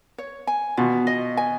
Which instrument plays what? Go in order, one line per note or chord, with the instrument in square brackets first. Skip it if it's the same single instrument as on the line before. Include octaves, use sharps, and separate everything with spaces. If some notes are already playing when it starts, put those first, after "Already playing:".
[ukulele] C#5
G#5
[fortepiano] B2 [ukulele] F4
[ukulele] D#5
G#5